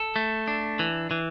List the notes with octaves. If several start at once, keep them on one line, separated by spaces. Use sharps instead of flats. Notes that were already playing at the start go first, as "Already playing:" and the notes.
Already playing: A4
A3
D4
E3
E3